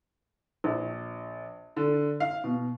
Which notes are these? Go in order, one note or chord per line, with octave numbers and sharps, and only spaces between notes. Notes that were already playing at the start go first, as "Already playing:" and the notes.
A#1
D3
F5
B2